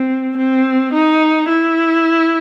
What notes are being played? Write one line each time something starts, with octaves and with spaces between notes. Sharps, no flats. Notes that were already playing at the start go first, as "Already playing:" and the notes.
Already playing: C4
C4
D#4
E4